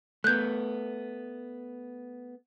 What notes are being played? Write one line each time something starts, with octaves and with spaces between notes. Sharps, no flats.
A3 B3 F#6 G6